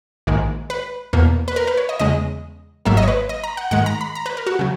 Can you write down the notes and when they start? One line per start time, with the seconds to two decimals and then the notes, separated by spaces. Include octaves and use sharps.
0.27 A#1 G#2 D#3 G#3
0.70 B4
1.13 E2 B2 A#3
1.48 B4
1.56 A#4
1.67 B4
1.77 C#5
1.89 D#5
1.99 E2 C#3 G#3 D#5
2.85 G#1 G#2 F#3 A#3 E5
2.97 D#5
3.03 C#5
3.08 B4
3.29 D#5
3.44 A#5
3.57 F#5
3.71 G#2 D#3 G#3 F#5
3.86 A#5
4.01 B5
4.15 A#5
4.26 B4
4.37 A#4
4.47 F#4
4.59 C#3 F#3